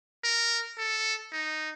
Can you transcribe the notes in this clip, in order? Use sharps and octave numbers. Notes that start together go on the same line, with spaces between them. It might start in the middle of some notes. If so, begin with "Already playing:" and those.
A#4
A4
D#4